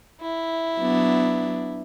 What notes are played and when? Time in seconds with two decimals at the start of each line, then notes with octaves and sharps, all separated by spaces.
0.21 E4
0.77 F#3 B3 D4